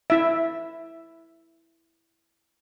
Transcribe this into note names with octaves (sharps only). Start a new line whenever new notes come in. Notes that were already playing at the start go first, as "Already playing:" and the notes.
E4 E5